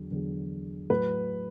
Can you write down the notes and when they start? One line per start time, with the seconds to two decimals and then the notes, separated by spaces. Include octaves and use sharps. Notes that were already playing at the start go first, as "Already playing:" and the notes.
Already playing: E2 D3 F#3
0.11 E2 D3 F#3
0.90 A2 F#3 B4